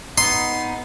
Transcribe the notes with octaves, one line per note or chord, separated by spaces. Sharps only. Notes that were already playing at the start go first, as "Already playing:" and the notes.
B3 D#4 C6